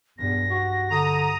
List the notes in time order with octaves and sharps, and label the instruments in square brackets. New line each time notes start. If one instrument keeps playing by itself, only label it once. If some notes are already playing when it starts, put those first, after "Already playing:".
[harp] B1 G2 [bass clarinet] E2 [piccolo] A#6
[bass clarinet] F#4 [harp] F5 C#6
[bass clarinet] D3 [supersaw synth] A#5 D#6